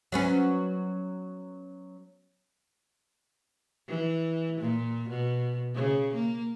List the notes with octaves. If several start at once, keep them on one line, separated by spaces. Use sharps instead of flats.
F#3 B3 C#4
E3
A#2
B2
C#3
A#3